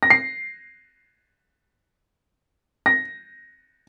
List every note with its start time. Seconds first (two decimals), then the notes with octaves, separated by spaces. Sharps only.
0.03 A#6
0.10 C7
2.86 A#6